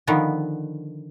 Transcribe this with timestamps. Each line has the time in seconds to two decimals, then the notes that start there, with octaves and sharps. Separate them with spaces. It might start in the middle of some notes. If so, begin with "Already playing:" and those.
0.07 D3 D#3 F3 B3